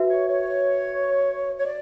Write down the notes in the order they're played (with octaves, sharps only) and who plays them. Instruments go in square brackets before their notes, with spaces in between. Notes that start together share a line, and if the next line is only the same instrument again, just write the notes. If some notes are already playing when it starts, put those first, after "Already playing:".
Already playing: [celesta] F#4 B4 E5
[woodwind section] C#5
C#5
C#5
D5